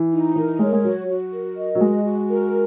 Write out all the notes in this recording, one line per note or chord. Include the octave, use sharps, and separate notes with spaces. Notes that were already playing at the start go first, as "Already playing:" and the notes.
Already playing: E3
D#4
E3 A#4
G#3 C#5
G#3
F#3 F#4
F#4
A#4
D#5
F#3
G#3 F#4
F#4
A#4